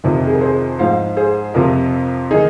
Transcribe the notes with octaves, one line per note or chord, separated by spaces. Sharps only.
F2 C3 D#3
G#4
A#4
G#4 C5
G#2 F3 C5 F5
G#4 C5
F2 C3 F3 F4 A#4
D#3 D#4 G#4